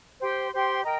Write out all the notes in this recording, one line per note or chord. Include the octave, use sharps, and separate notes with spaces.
G4 C5 G5 C6
G4 C5 G5 C6
A#4 D#5 G5 A#5